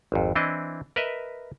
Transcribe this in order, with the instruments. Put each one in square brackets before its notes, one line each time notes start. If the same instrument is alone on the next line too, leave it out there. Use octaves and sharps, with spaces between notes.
[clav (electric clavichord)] G#1 F2
E3 C4 D4 E4 D#5
A#4 B4 D#5 E5